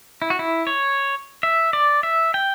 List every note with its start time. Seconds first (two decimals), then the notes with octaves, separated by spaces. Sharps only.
0.22 E4
0.30 F#4
0.39 E4
0.67 C#5
1.43 E5
1.73 D5
2.03 E5
2.34 G5